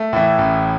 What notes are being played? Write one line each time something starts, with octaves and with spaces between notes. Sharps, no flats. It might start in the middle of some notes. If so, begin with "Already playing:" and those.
Already playing: A3
A2 E3
A1